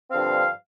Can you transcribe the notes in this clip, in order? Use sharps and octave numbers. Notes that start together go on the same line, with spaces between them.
G2 D3 F3 C4 F5